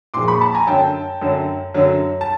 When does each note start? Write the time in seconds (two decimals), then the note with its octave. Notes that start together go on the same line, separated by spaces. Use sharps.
0.14 A#2 F3 G#3 C6 D6
0.28 B5 C#6
0.41 A5 B5
0.54 G#5 A#5
0.67 F#2 D3 F#3 G5 A5
1.21 F#2 D3 F#3
1.74 F#2 D3 F#3
2.21 A5